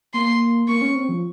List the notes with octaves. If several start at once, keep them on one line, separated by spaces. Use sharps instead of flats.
A#3 C6
A#3 C#6
C#4
C4
F3